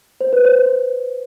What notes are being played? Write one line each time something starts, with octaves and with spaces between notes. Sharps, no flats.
C5
B4
C5